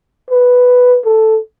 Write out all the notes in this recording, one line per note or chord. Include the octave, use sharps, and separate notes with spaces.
B4
A4